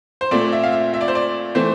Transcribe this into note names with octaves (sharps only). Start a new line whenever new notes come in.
C5
A#2 A3 C4 D5
E5
F5
E5
E5
D5
C5
D5
E3 A3 C4 C5